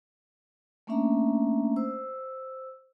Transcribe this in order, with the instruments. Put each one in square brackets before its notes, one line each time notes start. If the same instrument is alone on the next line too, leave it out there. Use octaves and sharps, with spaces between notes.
[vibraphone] A3 A#3 C#4 D4 E5 A#5
C5 E6